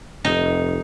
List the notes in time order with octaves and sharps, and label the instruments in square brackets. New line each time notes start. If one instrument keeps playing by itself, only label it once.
[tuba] F1 [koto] D#4